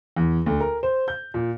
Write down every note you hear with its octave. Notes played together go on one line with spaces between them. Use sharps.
E2
D2
A#4
C5
G6
A#2